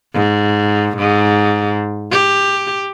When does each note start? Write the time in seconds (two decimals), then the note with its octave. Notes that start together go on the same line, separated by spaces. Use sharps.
0.14 G#2
0.97 G#2
2.11 G4